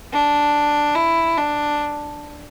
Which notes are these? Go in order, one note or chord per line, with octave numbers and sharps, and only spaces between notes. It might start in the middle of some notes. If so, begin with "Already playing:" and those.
D4
E4
D4